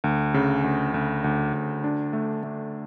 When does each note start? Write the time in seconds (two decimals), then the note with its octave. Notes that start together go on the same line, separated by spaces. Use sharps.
0.04 D2
0.34 C#3
0.64 D2
0.94 D2
1.24 D2
1.54 D2
1.84 D4
2.13 A3
2.43 A3